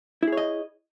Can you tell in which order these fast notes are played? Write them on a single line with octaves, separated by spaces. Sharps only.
E4 G#4 C#5 D#5